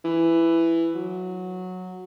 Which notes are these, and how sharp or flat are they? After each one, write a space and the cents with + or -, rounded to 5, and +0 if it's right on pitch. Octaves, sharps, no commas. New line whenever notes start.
E3 +10
F#3 -10